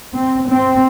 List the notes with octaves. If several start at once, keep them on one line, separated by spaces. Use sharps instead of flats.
C4
C4